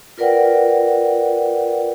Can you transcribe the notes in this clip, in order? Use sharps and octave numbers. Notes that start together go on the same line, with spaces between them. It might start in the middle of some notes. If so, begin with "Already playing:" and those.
F4 A#4 B4 D5 F#5 G5